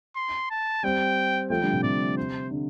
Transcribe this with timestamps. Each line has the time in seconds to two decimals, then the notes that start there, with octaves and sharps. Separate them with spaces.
0.16 C6
0.50 A5
0.83 G3 C4 G5
1.50 F3 A3 G5
1.62 D3 G3
1.73 C3 F3
1.83 C3 D5
2.17 C5
2.51 D3